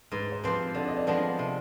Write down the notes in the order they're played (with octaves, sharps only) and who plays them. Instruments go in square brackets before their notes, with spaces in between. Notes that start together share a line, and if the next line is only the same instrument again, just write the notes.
[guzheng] G#2 [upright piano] B4
[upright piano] C5
[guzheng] F3 C4 G4 [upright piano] B4
[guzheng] D3 [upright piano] D5
[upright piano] D#5
D5
[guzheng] F3 G#3 B3 D4 [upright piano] C5
[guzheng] C3